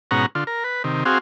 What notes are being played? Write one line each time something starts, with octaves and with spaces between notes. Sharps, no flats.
G#2 B2 C#4 F#5 A#5
D3 F4
A#4
B4
C3 D#3
C4 F#4 G#4 F5